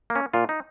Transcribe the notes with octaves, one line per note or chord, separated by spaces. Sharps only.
A#3
C#4
A#2 F4
D#4